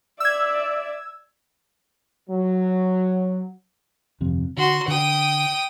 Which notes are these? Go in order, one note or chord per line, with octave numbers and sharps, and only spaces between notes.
D5 E5 E6 G#6
F#3
G1 F2 C3
D3 F#4 C6
D3 G5 D#6